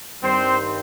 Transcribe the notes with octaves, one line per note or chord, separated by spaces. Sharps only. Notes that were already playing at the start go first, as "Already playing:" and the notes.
G2 D#3 G3 C4 C5